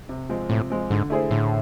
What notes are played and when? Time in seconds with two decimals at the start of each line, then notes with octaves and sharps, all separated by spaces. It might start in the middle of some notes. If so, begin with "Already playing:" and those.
0.09 C3
0.29 F3 G#3 C4
0.49 A2 C3
0.70 F3 G#3 C4
0.90 G#2 D3
1.10 A3 E4 G#4 C5
1.31 A2 D3